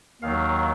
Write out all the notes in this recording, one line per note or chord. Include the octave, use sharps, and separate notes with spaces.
D#2 D#3 F#3 F5